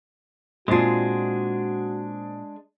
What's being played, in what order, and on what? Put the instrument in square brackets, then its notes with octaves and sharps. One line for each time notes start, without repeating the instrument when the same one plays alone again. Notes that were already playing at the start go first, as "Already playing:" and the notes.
[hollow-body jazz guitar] A#2 [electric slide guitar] G#3 D4 G#4 [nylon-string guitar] C4 F4 [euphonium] F#4